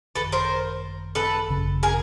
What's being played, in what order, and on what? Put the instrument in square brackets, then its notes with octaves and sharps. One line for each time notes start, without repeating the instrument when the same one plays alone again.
[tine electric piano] G#1 F#2 D#3 [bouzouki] A4 B4
[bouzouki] A#4 C5
A4 B4
[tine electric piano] G#1 F#2 C#3
[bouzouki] G#4 A#4